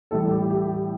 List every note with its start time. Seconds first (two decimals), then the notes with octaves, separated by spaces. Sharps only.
0.11 A2 E3 G3 A4
0.31 G4
0.50 G4